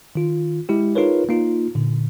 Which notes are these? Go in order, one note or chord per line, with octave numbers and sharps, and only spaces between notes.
D#3 F4
G#3 E4 G4
D#4 F4 G#4 A#4 B4 C#5
A#3 D#4 F4
A#2 D3